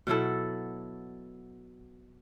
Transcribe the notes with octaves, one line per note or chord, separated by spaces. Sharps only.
B2 F#3 E4 A4